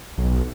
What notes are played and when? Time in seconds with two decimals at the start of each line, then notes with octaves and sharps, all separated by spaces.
0.18 B1